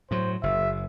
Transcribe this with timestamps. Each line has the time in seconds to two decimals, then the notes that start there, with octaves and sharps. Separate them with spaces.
0.11 A2 F#3 C5
0.43 F#1 E5